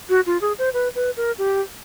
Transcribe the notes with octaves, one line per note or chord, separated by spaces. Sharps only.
F#4
F4
G#4
C5
B4
B4
A#4
G4